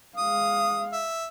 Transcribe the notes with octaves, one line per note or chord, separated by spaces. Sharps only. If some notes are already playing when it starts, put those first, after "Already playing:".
G#3 F5 D#6
E5